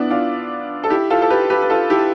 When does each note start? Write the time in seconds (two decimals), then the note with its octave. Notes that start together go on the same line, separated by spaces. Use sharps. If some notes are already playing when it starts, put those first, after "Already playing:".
Already playing: B3 D4 E4
0.10 D4 F4
0.84 A4
0.90 E4 G4
1.10 F4 A4
1.22 A4
1.30 G4 B4
1.50 G4 B4
1.62 B4
1.70 F4 A4
1.90 E4 G4